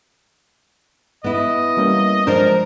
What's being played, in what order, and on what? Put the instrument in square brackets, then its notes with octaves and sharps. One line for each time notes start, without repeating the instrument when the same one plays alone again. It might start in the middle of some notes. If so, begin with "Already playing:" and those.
[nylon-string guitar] B3 E4 [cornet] D#5
[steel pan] G3 A#3 C#4
[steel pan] F3 G#3 D4 [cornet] A#4 [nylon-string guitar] C5 D5